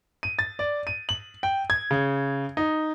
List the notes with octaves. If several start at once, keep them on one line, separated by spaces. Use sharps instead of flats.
D#7
A6
D5
D#7
F#7
G5
G#6
C#3
D#4